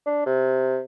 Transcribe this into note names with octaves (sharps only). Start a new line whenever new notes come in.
D4
C3